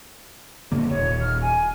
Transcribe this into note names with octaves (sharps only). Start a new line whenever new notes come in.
G2 D3 A#3
D#1 C#5
F6
G#5